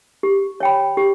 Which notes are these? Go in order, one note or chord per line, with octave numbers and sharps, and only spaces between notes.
G4
C#5 G5 B5
G4